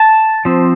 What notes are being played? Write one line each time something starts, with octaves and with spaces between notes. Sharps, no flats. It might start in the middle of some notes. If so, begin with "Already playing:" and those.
Already playing: A5
F3 C4